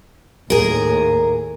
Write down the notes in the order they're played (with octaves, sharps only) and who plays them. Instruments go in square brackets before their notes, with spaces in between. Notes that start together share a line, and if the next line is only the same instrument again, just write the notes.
[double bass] D#2 A2 [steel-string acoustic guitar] G#4 A#4